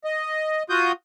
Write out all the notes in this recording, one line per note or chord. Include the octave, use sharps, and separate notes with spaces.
D#5
F4 F#4 D#6 G6